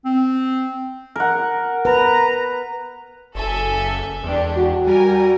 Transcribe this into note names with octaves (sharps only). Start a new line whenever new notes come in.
C4
A#4 F#5
B4 A#5
F#1 A4 E5 G#5
E2 G#3 D4 G4
F#4
G3 A#4 G#5